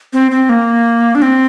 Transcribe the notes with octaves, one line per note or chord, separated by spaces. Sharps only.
C4
C4
A#3
D4
C4